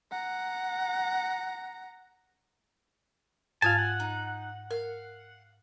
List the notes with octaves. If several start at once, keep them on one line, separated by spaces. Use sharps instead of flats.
F#5 A#5
G#2 F4 F5 G#5 A5
F#5
D#4
A#4 F5